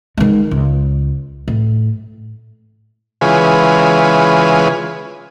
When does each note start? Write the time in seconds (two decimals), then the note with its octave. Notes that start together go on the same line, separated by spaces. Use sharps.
0.17 D#3 G#3
0.51 C#2
1.48 A2
3.21 C#3 E3 G#3 F4 G#4 B4